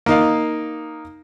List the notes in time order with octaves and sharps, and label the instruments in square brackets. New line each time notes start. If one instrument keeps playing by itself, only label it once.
[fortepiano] A#3 D#4 F5